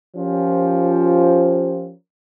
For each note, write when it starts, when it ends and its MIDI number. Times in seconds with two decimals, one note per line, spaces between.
0.16 1.91 53
0.16 1.91 61
0.16 1.91 65
0.16 1.91 67
0.16 1.91 70
0.16 1.91 72